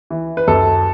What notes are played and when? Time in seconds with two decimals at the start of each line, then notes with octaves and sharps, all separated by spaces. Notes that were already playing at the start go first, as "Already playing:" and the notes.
0.10 E3
0.37 B4
0.48 F#2 A4